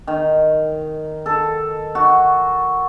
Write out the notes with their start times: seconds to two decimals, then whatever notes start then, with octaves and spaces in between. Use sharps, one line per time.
0.07 D#3
1.26 A4
1.95 F#4